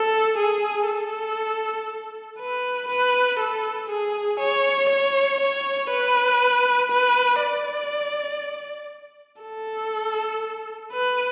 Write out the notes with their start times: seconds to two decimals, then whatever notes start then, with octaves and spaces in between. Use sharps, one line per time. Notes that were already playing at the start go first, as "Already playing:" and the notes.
Already playing: A4
0.38 G#4
0.88 A4
2.39 B4
2.89 B4
3.39 A4
3.90 G#4
4.40 C#5
4.89 C#5
5.40 C#5
5.91 B4
6.92 B4
7.41 D5
9.42 A4
10.93 B4